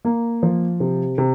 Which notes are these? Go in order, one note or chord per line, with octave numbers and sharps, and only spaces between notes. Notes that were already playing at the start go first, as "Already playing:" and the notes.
A#3
F3
C3
C3